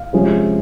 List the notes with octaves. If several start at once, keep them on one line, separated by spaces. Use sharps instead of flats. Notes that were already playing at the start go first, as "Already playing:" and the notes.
Already playing: F5
C3 F3 G#3 C#4